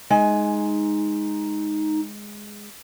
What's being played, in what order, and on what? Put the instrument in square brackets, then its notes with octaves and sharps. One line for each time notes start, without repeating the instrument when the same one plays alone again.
[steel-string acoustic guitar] G#3 G#5 [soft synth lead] D#4